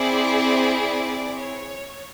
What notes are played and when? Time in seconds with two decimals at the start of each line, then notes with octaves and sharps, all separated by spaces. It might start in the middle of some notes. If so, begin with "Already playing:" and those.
Already playing: C4 E4 G#4 D5
0.78 D5
1.40 C#5